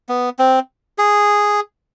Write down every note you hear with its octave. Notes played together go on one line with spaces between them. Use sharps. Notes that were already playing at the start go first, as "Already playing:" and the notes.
B3
C4
G#4